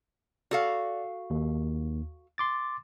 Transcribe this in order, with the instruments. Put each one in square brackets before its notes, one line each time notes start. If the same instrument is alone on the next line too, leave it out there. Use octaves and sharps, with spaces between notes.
[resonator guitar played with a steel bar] F#4 A4 F5 [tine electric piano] D5
[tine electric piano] D#2
C6 D6 A6